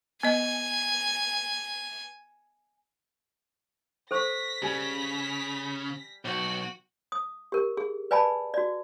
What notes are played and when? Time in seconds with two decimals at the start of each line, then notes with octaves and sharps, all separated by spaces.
0.23 B3 D#5 G#5
4.11 A4 C5 C#6 A#6 B6
4.62 C#3 G3 G#5
6.25 B1 F#4 G5
7.12 D#6
7.52 G4 A#4
7.77 G#4
8.11 B4 D5 G#5 A5 B5
8.54 F#4 D5